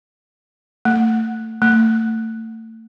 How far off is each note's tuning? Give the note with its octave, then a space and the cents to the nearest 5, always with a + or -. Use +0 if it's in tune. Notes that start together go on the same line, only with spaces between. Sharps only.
A3 +25
A3 +30